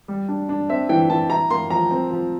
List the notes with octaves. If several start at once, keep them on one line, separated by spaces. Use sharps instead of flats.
G3
D4
D4
C4 E5
E3 G5
E3 A5
E4 A#5
A#3 C6
F3 A#5
C4
F3